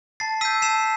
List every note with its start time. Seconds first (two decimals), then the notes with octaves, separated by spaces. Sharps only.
0.20 A5 A6 C7
0.41 E6 B6 D#7
0.45 G6
0.62 A5 C7 E7